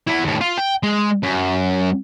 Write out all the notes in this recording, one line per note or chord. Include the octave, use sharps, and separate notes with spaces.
B3 E4
D#2 A2
F4
G5
G#3
F#2